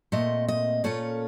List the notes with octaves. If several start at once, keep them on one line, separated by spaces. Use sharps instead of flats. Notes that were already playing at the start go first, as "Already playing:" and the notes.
A#2 A3 C4 D#5
D#5
A#2 A3 C#4 F4 C#5